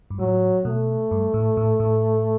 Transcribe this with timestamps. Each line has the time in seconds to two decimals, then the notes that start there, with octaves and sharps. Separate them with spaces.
0.10 G2
0.19 A2 F#3
0.65 B2 A3
1.11 G2
1.34 A2
1.57 A2
1.80 A2